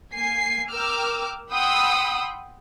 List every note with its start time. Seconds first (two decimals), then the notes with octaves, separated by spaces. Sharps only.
0.13 A#3 G#5 C7
0.72 A#4 G5 D6 E6 F6
1.52 F#5 G5 B5 C6 D#6 E6